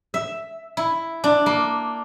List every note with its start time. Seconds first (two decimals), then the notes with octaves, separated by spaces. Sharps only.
0.14 E5
0.77 E4
1.24 D4
1.46 A#3